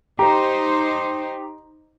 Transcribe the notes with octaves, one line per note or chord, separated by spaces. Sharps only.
D#4 G4 C5 A#5